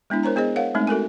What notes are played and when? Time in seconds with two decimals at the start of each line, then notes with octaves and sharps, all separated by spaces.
0.10 G#3 B3 D4 E4
0.23 A#4 C5 C#5 A#5
0.36 B3 G#4 C5 D#5
0.56 A#4 C#5 F5 F#5
0.74 G#3 A3 C4 D#4
0.87 F#4 A4 A#4 G#5